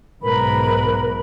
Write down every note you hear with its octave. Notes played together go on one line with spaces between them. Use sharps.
B1 G#2 A#4 B4 B5